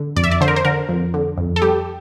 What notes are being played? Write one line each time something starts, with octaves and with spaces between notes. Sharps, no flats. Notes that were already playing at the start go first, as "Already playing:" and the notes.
Already playing: D3
F2 D5
E5
D5
D3 C5
A#4
C5
D3 A#4
F2
D3
F2
A4
G3 G4